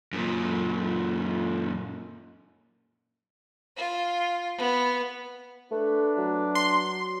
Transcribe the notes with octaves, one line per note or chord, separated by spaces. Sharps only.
F#2 A#2
F4
B3
A3 D4 B4
F#3
C6